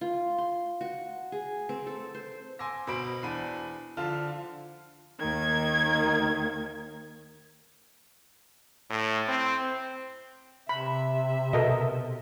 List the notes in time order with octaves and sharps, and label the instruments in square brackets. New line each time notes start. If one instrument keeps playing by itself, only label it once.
[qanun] F4
C6
F#4
G#4
C4
A4
C5
[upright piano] G#5 C6 D6 E6 A#6
B2 C5 B5 D7
E2 D4 B5 D#7
D3 F3 F4 A5 F6
[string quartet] D#2 D#3 G#6
[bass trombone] A2
C4
[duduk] C3 [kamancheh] E5 [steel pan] B5
[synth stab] B2 [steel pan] A4 A#4 D#5